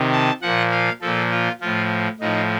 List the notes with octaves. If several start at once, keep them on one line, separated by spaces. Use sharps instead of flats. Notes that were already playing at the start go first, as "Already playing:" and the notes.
Already playing: C3 D#3
A5
A#2 F3 F#5
F5
A#2 F3 A4
F4
A2 F3 F4
A2 F3 D#4